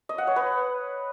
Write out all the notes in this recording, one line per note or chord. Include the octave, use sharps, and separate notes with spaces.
D#5
F#5
C#5
B4